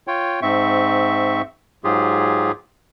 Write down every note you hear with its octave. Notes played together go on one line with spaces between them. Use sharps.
F4 C#5 G5
G#2 C4 E5 C#6
G#2 F#3 F4 G4 G#4